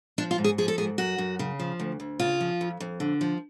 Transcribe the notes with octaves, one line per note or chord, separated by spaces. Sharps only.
F3 D4
F4
G#2
G#4
F3 G#4
A4
G#2 G#4
F#2 F#4
F#2
C#3
F3
D2
D2
C#3 F4
F3
F2
F2
D3
F3